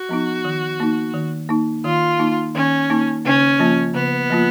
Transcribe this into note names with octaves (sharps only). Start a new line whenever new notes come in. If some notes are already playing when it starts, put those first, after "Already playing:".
Already playing: F#4
F3 B3 D#4
D#3
A#3 D#4
D#3
A#3 D#4
D#3 F4
A#3 D#4
D#3 C#4
A#3 D#4
C#3 C#4
F3 A#3 F4
C#3 B3
F3 A#3 F4